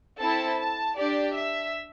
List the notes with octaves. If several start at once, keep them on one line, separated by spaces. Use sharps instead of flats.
C4 E4 A4 A5
A5
D4 G4 D5
E5